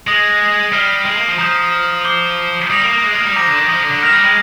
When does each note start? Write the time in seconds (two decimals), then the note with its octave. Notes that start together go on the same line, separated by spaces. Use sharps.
0.07 G#3 D#6 A#6 D7
0.72 G3 F6 C7 D#7 G7
1.05 G#3
1.17 A#3
1.28 F3
1.38 F3 A#5 D#6 G6
2.05 D6 G6 C7 G7
2.70 G3 D#6 A#6 F7
2.81 A#3
2.92 A#3
3.03 G#3
3.14 A#3
3.25 G3
3.36 F3 A#5 D6 G6 A#6 D7
3.47 D3
3.58 D#3
3.68 F3
3.80 D3
3.91 D3
4.02 D#3 F6 A#6 F7
4.12 G3
4.23 G#3